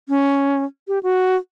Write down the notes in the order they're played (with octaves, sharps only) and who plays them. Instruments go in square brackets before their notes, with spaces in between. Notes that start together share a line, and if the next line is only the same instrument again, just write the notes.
[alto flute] C#4
G4
F#4